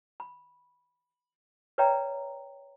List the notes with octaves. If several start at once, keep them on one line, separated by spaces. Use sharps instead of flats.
B5
B4 C#5 D5 E5 G5 A#5